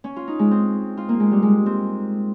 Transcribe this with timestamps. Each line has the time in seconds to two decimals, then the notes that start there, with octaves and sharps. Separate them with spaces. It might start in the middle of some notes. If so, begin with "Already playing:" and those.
0.04 C#4
0.16 F4
0.27 D#4
0.39 G#3
0.51 C4
0.97 F4
1.09 A#3
1.20 G#3
1.32 G3
1.42 G#3
1.66 C4